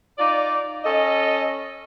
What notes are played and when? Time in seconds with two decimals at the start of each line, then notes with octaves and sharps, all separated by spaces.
0.18 D#4 F4 D5
0.84 C#4 A4 D#5